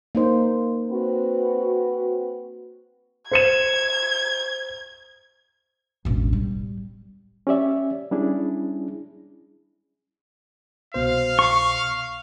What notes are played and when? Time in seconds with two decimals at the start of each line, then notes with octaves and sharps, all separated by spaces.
0.15 A#3 D#4 C5
0.90 C4 F#4 B4
3.32 C5 G#6 C#7 E7
6.05 E1 A1
6.33 G3
7.47 C#4 G4 D5 E5
8.11 G3 C#4 D4 E4 G#4
10.94 C2 B2 C5 F5
11.39 C#6